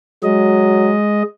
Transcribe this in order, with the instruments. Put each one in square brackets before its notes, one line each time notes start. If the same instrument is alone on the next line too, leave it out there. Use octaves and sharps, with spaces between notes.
[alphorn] F#3 [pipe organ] G#3 D#5